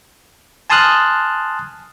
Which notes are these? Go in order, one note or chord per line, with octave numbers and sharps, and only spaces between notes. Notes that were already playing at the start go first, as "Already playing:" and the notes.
G#5 A5 C6 D#6 F6 F#6